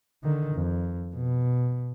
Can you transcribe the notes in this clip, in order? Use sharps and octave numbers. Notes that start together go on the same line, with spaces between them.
D3 D#3
F2
B2